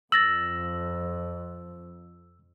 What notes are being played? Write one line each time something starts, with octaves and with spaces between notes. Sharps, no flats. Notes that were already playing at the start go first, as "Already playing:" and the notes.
F2 E6 A6 A#6 F#7